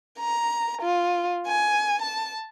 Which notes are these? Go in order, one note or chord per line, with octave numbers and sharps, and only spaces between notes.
A#5
F4
G#5
A5